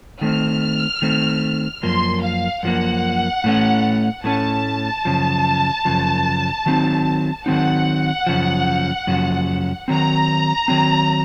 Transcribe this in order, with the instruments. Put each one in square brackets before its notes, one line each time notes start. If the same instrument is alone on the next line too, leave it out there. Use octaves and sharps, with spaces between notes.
[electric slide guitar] D#3 A3 C4 [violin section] F6
[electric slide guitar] D#3 A3 C4
[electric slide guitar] F#2 F3 A#3 [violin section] C6
[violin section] F5
[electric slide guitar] F#2 F3 A#3 [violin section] F#5
[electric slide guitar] A2 A3 C#4
[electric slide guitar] A2 A3 C#4 [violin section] A5
[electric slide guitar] F#2 C#3 F3
F#2 C#3 F3
D#3 F#3 C4 D#4
[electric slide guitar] D#3 F#3 C4 D#4 [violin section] F#5
[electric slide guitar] F#2 C#3 F3
F#2 C#3 F3
[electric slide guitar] D#3 F#3 C4 [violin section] A#5
[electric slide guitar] D#3 F#3 C4